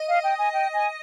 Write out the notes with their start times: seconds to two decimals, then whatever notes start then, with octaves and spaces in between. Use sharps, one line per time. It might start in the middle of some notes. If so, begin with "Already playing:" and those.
Already playing: D#5
0.08 F5
0.24 G5
0.38 G#5
0.53 G5
0.74 G#5